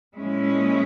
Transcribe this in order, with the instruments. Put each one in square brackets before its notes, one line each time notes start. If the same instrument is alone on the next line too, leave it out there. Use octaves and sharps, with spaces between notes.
[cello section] A#2 F3 G#3 C#4 E4